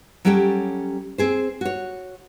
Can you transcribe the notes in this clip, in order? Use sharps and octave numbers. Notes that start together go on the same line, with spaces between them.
F#3 G3 C#4 G4 A4 G5
C4 G#4 C5
F#4 C#5